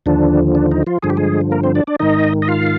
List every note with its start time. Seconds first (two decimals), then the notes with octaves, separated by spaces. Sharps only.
0.06 D#2 D3 F3 D4
0.55 D4
0.71 D#4
0.87 F3 F4
1.03 G2 D3 F3 G#4
1.10 G4
1.17 G#3 G#4
1.51 A#3 A#4
1.63 C4 C5
1.75 D4 D5
1.87 D4 D5
1.99 G#2 D#3 D#4 D#5
2.42 D#5
2.48 F4 F5